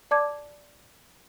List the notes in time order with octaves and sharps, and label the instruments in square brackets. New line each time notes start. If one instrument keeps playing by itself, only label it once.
[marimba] D5 A5 D6 G#6